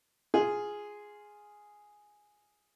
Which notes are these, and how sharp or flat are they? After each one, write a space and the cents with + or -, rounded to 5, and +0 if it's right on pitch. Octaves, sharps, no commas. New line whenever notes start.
F4 +0 G#4 +0